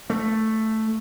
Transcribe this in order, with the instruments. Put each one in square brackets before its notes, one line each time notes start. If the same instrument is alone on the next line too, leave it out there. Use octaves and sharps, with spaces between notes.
[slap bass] A3